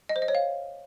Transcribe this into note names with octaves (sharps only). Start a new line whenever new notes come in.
D#5
C5
D#5
C#5
F5